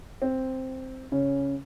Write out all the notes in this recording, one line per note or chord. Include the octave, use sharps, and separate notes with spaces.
C4
C#3 C#4